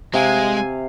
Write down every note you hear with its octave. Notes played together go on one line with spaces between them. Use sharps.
C3 G#3 F5 G#5